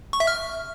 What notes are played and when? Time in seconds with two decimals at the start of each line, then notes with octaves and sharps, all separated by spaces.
0.13 C#6
0.20 E5
0.27 F6